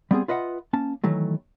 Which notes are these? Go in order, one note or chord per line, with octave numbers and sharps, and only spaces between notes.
G3 B3 C4 G#4
F4 B4 D#5 E5 F#5
A#3 C#4 A5
D#3 E3 F#3 A3